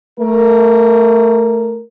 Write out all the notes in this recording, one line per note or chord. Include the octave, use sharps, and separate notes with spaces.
A3 A#4